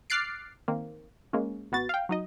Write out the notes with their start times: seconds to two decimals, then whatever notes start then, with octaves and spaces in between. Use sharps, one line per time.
0.10 D6 F6 F#6 A6 C7 D7
0.68 D#3 A#3 C4
1.33 G#3 A#3 C#4
1.72 A1 B3 F#4 A6
1.89 F5 G5
2.09 F#3 D#4 D#5